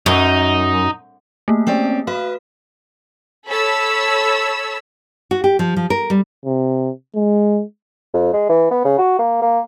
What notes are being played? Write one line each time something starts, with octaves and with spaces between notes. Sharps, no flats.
F#2 D#4
A3 A#3
C4 C#4 D5
F#4 B4 F5
A4 C#5 B5 E6
F#4
G4
F3
F3
A#4
G3
C3
G#3
F2
G#3
E3
B3
C#3
F#4
A#3
A#3